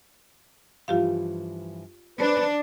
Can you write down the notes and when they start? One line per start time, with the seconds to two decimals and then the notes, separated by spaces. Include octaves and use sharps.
0.88 G2 E3 F3 F4 G4 F5
2.20 D4 B4 C5